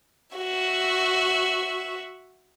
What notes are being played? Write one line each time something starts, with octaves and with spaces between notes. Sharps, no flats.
F#4 E5